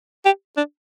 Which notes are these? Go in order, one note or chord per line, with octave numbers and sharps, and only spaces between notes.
G4
D4